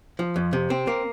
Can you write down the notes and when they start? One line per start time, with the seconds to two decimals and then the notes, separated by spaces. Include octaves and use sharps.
0.19 F3
0.36 F2
0.53 C3
0.70 C4
0.87 A#3